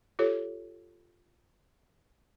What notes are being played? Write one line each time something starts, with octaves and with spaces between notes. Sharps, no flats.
F4 G4 A4 C#5